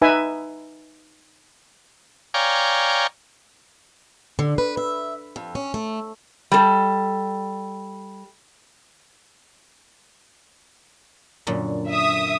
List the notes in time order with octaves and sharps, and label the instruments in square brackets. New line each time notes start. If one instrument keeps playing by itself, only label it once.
[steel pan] D#4 B4 E5 G#5
[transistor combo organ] C#5 D5 F5 G5 G#5 A#5
[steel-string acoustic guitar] D3
B4
E5
F2
C#4
A3
[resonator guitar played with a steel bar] G3 A4
[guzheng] F#2 A#2 D3
[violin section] E5 D#6